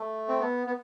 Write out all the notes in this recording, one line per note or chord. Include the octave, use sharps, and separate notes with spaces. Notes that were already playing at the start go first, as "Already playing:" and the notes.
Already playing: A3
C4
B3
B3